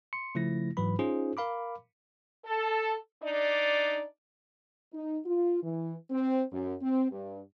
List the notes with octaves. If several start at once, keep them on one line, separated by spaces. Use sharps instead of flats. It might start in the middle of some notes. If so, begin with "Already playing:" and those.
C6 C#7
C#3 F3 A3 E4 A#6
G#2 E3 F#3 B4 B5
C#4 D#4 F4 G#4 C5
A#4 F5 B5 D6
A4
D4 D#4 D5
D#4
F4
E3
C4
F#2
C4
G2